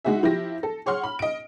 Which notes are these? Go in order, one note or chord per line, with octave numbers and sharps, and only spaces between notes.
G#3 D#4 F#4 G#4 E5
F3 E4 G4 A#6
A4
G#4 C#5 F#5 C6 F6
B5
D#5 D7